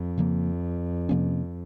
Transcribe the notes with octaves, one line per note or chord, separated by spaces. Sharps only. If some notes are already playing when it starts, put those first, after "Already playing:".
Already playing: F2
C#3 F3 A#3
C3 F3 A#3 C#4